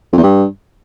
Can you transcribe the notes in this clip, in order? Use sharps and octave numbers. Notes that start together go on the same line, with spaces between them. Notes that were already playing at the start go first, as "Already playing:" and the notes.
F2
E2
G2